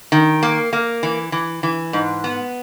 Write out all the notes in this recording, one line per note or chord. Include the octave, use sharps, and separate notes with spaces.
D#3
A#3
A#3
E3
E3
E3
G#2
B3